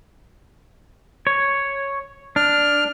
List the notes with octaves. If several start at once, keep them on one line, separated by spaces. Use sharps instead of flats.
C#5
D4 F6